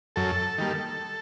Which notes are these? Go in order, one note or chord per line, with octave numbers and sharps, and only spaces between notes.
F#2 A4
D#3 G3 A#3